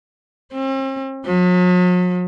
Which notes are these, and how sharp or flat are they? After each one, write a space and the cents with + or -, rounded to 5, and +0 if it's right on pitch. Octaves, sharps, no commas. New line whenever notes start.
C4 +45
F#3 -45